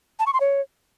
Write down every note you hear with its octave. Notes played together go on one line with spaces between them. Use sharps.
A5
C#6
C6
C#5